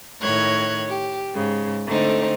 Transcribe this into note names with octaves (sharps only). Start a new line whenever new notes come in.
A2 D#3 C#5 F#6 G#6
G4
G#2 C#3
D3 A3 C4 D#4